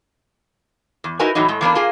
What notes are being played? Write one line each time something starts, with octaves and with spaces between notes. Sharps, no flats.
E2
D#4 E4 F#4 A#4 B4 G#5
A2 E3 F#3 D#4
A2 G#3
E3 A#3 B3 D4
A#3 F4 G#4